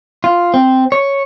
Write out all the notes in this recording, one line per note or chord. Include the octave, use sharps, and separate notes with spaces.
F4
C4
C#5